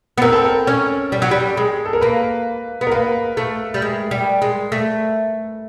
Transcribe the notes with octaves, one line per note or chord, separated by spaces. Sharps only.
B3
C4 A#4
A4
A#4
C#4
G3
F#3
G3
G#3
A4
A#4
A#3 B4
B3
A#4
A#3 B4
A3
G3
G#3
G3
G#3
A3